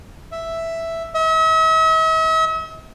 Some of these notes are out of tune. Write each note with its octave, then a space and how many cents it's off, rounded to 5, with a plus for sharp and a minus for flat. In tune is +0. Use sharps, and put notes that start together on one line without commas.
E5 +0
E5 -45